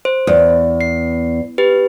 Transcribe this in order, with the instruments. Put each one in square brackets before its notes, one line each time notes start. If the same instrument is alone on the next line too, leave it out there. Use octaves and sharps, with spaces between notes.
[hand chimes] C5
[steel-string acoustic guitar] E2
[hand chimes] C7
G4 B4